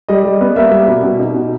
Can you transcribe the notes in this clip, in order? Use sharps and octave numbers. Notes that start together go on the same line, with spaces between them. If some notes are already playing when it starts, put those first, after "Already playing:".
G3 D#5
G3
B3
A#3 E5
G3
B2
B2
D#4
B2